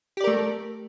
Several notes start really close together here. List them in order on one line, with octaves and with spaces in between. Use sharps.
G4 D5 A#4 A3